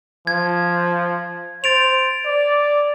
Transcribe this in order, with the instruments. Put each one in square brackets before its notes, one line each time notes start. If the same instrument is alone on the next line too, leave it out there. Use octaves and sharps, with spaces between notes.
[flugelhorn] F3 [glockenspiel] G#6
[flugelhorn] C5 [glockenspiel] A6 D7 F7
[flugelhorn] D5